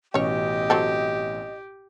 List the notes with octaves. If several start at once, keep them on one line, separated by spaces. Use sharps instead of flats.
A1 B2 C#4 G4 C#5 D#5
F#3 C4 A4